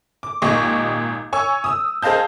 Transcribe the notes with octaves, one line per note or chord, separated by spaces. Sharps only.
D6
G#1 A#2 G4 D#5 C#6
C#5 G#5 C#6 E6
D#6 E6
G#4 C5 D#5 F5 A5 G6